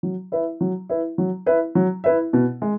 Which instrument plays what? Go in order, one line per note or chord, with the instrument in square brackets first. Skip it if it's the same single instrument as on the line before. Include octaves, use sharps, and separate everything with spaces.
[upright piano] F#3
E4 B4 E5
F#3
E4 B4 E5
F#3
E4 B4 E5
F#3
E4 B4 E5
B2
G#3